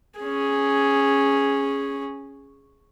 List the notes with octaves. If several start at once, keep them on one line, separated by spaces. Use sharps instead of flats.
C#4 G#4